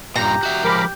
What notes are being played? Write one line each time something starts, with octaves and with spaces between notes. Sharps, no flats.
G2 A#2 G4 A#5
F#4 E5
F3 G#3 A#4 B5 D6